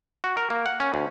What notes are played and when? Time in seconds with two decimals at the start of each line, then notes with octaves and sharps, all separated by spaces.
0.24 F#4
0.37 A#4
0.50 A#3
0.66 F#5
0.80 C#4
0.94 D2